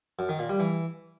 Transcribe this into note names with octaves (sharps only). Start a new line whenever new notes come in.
F#2
D#3
A#2
G3
E3